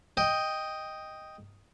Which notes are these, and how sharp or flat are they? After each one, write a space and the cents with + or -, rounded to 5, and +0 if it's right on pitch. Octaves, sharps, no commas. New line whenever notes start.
D#5 +0 G5 +5